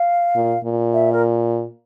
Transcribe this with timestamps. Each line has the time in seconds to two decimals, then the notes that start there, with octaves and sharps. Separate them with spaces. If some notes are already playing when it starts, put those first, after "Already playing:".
Already playing: F5
0.35 A#2
0.64 A#2
0.94 E5
1.13 A#4